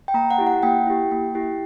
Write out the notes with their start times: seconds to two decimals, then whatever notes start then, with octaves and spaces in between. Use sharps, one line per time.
0.08 G5
0.14 A#3 A#5
0.31 F#5
0.38 E4 G4
0.47 F#5
0.63 A#3 G5
0.87 E4 G4
1.11 A#3
1.35 E4 G4